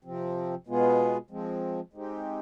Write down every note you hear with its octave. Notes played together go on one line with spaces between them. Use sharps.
C3 F3 C4
B2 G#3 B3 F4 G#4
F3 G#3 C4
G#3 C4 D#4 G4